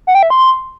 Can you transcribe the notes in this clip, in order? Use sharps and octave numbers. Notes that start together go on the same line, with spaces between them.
F#5
G5
E5
C6